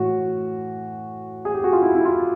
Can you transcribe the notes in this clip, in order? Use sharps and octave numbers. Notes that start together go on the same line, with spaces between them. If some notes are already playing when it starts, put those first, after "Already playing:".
Already playing: A2 E3 F#4
G#4
G4
F#4
F4
E4
E4
F4